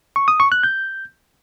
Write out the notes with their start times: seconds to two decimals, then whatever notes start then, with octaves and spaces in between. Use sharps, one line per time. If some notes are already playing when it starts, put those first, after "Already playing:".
0.16 C#6
0.28 D#6
0.40 C#6
0.52 F#6
0.63 G6